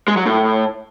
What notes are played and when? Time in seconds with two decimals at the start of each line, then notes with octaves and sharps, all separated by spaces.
0.08 G#3
0.17 F#3
0.26 A2